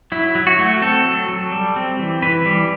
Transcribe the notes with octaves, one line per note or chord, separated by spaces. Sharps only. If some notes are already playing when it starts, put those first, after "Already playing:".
F#3 E4
F#3
F#4
A3
C4 A4
F#3
F#3
G3
C4
E3
E3 B4
G3